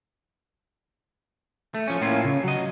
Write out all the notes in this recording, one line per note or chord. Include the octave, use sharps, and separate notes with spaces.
A3
F3 C#4
A2 A#3 C#4 E4 F4
C#3
F#3 D#5